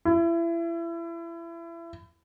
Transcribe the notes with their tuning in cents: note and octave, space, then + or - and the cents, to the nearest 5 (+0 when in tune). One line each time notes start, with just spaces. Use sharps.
E4 +30